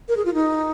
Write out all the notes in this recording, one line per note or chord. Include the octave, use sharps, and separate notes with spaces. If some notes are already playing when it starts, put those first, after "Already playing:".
A#4
G#4
F4
D#4